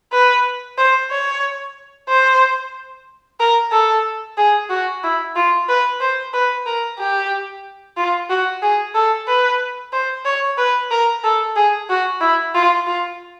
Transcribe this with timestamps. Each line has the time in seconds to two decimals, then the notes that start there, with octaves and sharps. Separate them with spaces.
0.12 B4
0.78 C5
1.11 C#5
2.09 C5
3.40 A#4
3.72 A4
4.37 G#4
4.70 F#4
5.03 E4
5.35 F4
5.68 B4
6.00 C5
6.33 B4
6.66 A#4
6.99 G4
7.97 F4
8.30 F#4
8.62 G#4
8.95 A4
9.28 B4
9.93 C5
10.25 C#5
10.58 B4
10.91 A#4
11.24 A4
11.56 G#4
11.89 F#4
12.21 E4
12.54 F4
12.87 F4